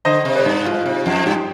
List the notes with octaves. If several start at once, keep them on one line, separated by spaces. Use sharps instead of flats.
D3 C5 D#5
C3
B4 D5
G2
G#2 F4
C3
F2
G2 G4